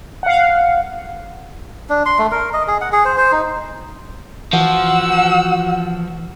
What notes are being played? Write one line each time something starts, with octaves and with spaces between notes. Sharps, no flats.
F5 F#5
D4
C6
A3
A#4
D#5
G#4
F#5
G#4
C5
C5
D#4
E3 F3 F#4 F#5 E6